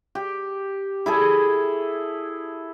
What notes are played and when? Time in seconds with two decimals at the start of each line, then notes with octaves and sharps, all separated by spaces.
0.15 G4
1.06 E4 G#4 A4